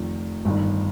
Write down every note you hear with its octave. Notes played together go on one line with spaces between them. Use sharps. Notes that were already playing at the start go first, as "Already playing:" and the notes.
Already playing: F1 F2 D#3
G1 G2 D#3